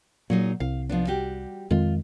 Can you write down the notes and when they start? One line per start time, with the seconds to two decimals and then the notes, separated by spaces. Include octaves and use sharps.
0.30 A#2 F#3 D#4 G#4
0.60 C2 F5
0.89 F3 B3 D4
1.07 G3 F#4 G4
1.71 F2 D#3 G#3 F4